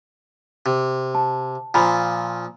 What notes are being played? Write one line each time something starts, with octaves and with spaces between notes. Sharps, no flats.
C3
A5
A#2 F3 G#5 A#5 B5